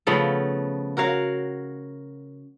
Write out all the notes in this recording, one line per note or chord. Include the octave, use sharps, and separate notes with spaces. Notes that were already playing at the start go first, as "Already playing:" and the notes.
C#3 F3 A3 B3
F#4 A#4 C#5 F5